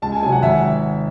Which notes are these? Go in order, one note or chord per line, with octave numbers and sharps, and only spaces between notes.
C#2 A5
G#5
C3 F#3 G#5
F#5
G#1 E5